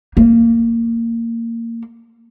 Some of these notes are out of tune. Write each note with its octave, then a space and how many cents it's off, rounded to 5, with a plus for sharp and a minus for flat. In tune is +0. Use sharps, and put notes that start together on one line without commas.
A#3 -20